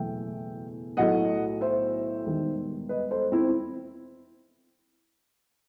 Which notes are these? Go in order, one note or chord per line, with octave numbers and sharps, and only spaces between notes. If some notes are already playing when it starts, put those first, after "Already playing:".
Already playing: F#1 E2 B2 A3 E5 G5
B1 A2 F#3 A3 D#5 F#5
C5 E5
E1 D#2 D#3 G3
B4 D#5
A4 C5
C4 E4